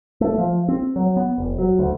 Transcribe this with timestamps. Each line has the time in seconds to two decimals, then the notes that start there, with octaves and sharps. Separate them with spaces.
0.21 A3
0.38 F3
0.68 C4
0.96 F#3
1.16 B3
1.38 F1
1.58 F#3
1.79 D2